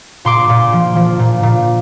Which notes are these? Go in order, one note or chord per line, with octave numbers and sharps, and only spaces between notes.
A#2 C6 D6
A#2
F3
F3
A#2
A#2